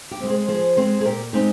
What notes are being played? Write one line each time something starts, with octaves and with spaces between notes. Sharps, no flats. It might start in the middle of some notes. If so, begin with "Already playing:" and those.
G4
G#3 C4
G#4 C5
F3 G#4 C5
G#3 C4 G#4 C5
G#4
A#2 G4 A#4
G#3 C4 D#4 G4